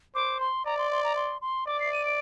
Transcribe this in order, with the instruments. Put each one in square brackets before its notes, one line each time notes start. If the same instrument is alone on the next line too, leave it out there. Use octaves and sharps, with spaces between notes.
[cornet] C5 [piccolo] D6
[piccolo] C6
[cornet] D5 [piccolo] A#5
[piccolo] C6
C6
A#5
C6
C6
[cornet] D5 [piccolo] D6
[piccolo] C7
D#7
D7